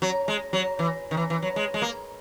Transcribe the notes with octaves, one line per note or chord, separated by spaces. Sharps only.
F#3
G#3
F#3
E3
D#3
E3
E3
F#3
G#3
G#3
A#3